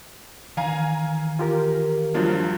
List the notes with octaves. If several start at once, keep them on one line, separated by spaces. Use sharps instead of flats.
D#3 E3 F5 G#5 A#5
F4 G4 A#4
G2 F3 F#3